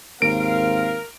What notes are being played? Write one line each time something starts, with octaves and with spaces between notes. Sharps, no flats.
D#2 G#2 C4 A#4 F5 D7